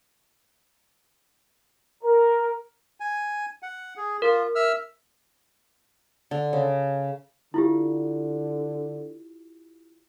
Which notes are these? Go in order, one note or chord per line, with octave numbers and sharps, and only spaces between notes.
A#4
G#5
F#5
G#4
F4 A#4
E5 E6 F6
D3
C#3
D3 E4 F4 G4